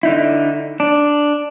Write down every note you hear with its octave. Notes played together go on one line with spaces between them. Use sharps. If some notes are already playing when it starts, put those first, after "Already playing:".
D3 D#4 E4
D4